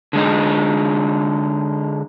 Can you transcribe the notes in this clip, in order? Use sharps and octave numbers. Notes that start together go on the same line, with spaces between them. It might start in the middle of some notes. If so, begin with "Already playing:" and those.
D3 G#3 D#4